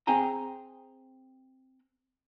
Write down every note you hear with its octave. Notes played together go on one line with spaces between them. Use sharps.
C4 G#4 G5 G#5 A#5